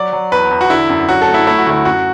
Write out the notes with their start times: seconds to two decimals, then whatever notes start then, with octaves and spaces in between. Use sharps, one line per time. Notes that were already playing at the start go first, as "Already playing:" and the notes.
Already playing: F#3 D5
0.13 F#3
0.32 E2 B4
0.51 E2
0.61 F#4
0.70 D3 E4
0.89 F#2
1.09 F#3 F#4
1.22 A4
1.28 A3
1.34 E4
1.47 A3 E4
1.58 F#4
1.66 D2 E4
1.85 F#2 F#4